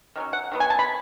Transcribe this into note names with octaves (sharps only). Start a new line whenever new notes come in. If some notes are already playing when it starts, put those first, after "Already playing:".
D#3 F#3 C#4
F#5
D#3 F#3 B3
G#5
A5
B5